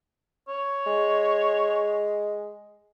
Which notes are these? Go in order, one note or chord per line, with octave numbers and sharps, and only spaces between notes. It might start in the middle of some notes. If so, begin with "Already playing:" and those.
C#5
G#3